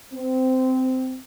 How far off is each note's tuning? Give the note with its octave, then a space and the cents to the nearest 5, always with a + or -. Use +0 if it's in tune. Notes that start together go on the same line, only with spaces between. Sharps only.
C4 -15